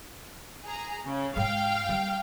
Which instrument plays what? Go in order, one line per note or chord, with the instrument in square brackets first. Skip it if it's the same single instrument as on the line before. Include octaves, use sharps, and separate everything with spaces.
[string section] G#4 A#5
C#3
[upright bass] G#2 G#3 [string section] F5 G5
[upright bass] G3 A#3